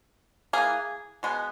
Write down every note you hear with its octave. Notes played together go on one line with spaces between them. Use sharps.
E3 A#3 G#4
B2 G#3 B3